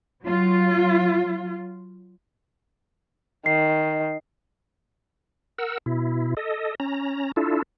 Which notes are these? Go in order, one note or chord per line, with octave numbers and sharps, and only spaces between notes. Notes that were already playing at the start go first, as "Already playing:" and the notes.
F#3 F4
D#3 C7
A#4 F#5 E6
B2 E4
A4 D#5
C#4 A#5
D4 E4 F4 A4